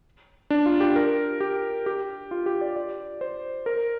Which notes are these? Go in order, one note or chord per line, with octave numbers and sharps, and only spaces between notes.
D4
F4
G4
A#4
G4
G4
F4
G4
D5
D5
C5
A#4